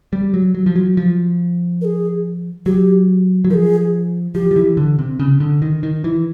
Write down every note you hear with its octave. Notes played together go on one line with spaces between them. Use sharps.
G3
F#3
F#3
F3
F#3
F3
A#4
G#4
F#3 G4
F#3
F3 G#4 A#4
F3 G4
F3
E3
D3
C3
C#3
D3
D#3
D#3
E3